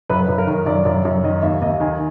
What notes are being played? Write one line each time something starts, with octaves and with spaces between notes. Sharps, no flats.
F#2 B4
F#2
A#4
D#3
F#2 D5
F#2
F#2
D#3 D#5
D#2 E5
D#2 D#5
D#3 G#5